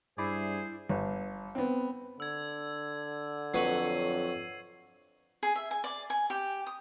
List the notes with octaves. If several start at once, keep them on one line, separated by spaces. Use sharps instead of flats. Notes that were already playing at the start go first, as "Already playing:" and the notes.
G2 E4 G#4 C5 D5
G1
B3 C4
D3 E6 G#6
F2 F#3 B4 C#5 C7 D#7 F#7
G#4
E5
G#5
D5
G#5
G4
D#6